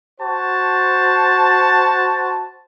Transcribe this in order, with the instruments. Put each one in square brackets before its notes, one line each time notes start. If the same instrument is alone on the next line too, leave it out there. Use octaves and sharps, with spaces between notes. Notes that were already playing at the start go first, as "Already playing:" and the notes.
[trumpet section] F#4 C5 A5